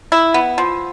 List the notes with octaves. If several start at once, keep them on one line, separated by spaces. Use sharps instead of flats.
E4
B3
F3